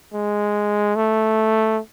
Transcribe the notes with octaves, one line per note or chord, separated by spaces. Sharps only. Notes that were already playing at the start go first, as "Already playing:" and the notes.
G#3
A3